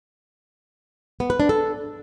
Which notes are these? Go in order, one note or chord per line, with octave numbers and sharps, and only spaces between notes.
B3
B4
D4
A4